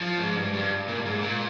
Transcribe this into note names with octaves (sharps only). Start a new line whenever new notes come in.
F3
G#2
G2
G2
A#2
G2
G#2
A#2